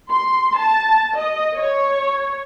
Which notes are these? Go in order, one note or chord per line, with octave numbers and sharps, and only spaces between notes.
C6
A5
D#5
C#5